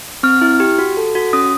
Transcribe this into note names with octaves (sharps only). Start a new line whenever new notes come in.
C4 F6
E4
G4
F#4
A4
F#4
C#4 D#6